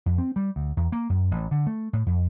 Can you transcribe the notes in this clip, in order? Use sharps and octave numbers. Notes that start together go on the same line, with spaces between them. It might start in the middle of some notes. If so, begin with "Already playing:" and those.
F2
C4
G3
D2
E2
A#3
F#2
A1
D3
A3
A2
F2